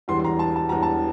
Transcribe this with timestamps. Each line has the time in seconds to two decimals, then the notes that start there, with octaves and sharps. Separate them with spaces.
0.08 E1 E2 E3 G3 C6
0.20 C6
0.24 A#5
0.39 A5
0.56 A5
0.69 E1 E2 E3 G3 A#5
0.83 A5